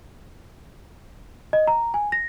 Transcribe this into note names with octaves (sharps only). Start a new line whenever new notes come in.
D#5
A#5
G#5
A#6